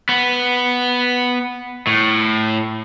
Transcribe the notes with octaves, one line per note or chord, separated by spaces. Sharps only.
B3
A2